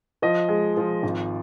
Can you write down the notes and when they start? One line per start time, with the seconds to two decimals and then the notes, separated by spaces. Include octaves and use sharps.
0.22 F3 D#5
0.49 G#3
0.77 F3
1.03 G#1